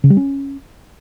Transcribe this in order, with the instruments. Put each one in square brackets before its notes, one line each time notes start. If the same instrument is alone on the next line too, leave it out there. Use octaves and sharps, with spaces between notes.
[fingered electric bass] C#3
G3
C#4